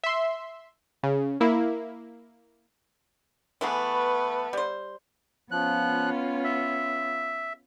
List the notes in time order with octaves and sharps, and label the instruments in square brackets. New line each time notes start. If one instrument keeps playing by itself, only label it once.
[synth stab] E5 C6
C#3
A#3 E4
[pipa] E3 A3 G#4 [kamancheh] B3 B4
[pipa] G3 C5
[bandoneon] F3 F#6 [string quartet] B3 C#4 F4
[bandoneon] E5